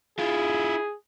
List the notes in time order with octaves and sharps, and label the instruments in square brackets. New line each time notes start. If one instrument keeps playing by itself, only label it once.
[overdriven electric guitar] E4 F4 [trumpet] G#4